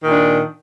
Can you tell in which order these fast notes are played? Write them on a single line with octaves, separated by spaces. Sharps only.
D#3 A#2 D4